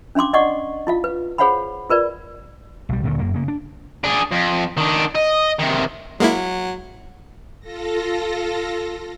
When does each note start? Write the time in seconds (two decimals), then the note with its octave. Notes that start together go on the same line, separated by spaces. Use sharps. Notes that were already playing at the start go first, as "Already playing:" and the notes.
0.15 C#4 D4 F5 C6 D6
0.33 D5 D#5 F#5 C#6 D6
0.87 E4 F4 F5
1.04 B4
1.38 G#4 C5 C#5 F5 F#5 B5
1.90 F4 A#4 B4 D5
2.89 B1 G3
3.03 D2 A#2 D3 D#3
3.19 F#2 A#3
3.34 C#3 A#3
3.48 D4
4.04 D4 G#4
4.31 F2
4.78 D#3 D4
5.15 D#5
5.59 C3 D#3
6.20 F#3 G#3 A#3 E4
7.60 F4 A4 A#6